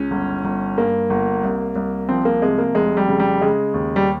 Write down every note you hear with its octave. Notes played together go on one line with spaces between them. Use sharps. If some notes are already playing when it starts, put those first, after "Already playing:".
Already playing: C#2 C#4
G1
G1
G2 A#3
G1
C2
C2
F3 C4
A#3
C3 G#3
A#3
F1 G#3
G3
C#3
G3
C#3 G#3
D#2
G3